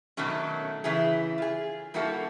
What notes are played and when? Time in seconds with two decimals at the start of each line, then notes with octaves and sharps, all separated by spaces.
0.17 B2 D#3 F#3 A3 C#4
0.84 C#3 E3 E4 G#4
1.38 F4 G#4
1.94 G3 A#3 E4 F#4 A4